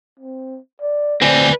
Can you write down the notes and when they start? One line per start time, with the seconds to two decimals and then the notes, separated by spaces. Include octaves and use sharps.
0.19 C4
0.82 D5
1.21 D2 C4 B4 D5 G#5